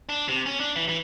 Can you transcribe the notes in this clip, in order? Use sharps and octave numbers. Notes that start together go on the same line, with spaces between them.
D4
C3
C#4
D4
E3
E3